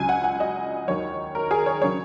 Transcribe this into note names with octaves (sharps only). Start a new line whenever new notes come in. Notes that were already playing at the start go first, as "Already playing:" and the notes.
Already playing: C#2 C#3 F#3 G#5
F#5
F#5
D#5
D#2 D#3 F#3 C#5
A#4
G#4
C#5
C#3 F#3 C#5